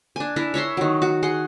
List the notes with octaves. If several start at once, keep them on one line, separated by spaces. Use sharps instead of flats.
D4 G#5
D4 E4 A#4
C#5 E5 A#5 C6
D#3 F#3
F#4
G#4 F#5 C6